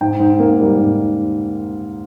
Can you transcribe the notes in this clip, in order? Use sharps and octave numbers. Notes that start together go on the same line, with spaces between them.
G#2 G5
G#2
A#3
G3
G#2